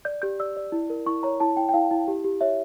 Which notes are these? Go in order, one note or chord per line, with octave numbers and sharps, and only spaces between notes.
D5 G6
G4 G6
D5 E6
D5
E4
A#4
E4 C#6
C#5 A#5
E4 A5
E4 G5
G5
E4 F5
E4
G4
G4
C#5 E5